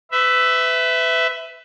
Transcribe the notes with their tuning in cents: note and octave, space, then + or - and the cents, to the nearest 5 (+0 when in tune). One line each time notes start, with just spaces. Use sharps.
B4 +30 E5 +0